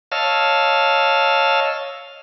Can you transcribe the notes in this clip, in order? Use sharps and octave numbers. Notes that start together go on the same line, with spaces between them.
C#5 D#5 F5 A5 E6 F6